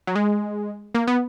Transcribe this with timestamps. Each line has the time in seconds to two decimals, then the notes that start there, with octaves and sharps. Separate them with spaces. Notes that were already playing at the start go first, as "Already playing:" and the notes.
0.07 F#3
0.16 G#3
0.95 A#3
1.07 B3